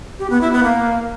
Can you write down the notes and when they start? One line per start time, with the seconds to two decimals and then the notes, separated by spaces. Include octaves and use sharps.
0.19 G4
0.30 B3
0.41 E4
0.52 B3
0.63 A#3